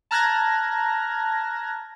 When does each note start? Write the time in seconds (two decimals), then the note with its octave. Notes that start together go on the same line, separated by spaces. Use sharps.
0.11 A5 A#5 F6 F#6 G#6 A#6